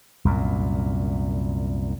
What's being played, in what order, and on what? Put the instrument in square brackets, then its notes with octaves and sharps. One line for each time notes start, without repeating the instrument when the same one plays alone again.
[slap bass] C2 F#2 A#2